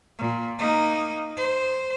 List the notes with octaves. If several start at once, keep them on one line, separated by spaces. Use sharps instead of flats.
A#2
A#3 D#4
C5